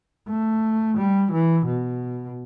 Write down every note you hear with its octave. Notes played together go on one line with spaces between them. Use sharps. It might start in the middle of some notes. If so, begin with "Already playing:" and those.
A3
G3
E3
B2